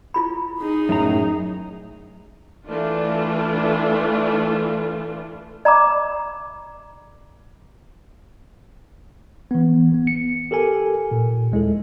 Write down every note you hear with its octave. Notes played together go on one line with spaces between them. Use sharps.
E4 F4 B5
D#4 G#4
F#2 A2 A#5
E3 A3 D4 F4
D5 A#5 B5 D6
E3 B3
A1 B3
C#7
G4 A4 A#4 G#5
A#2
D#2 G#3 E4 A4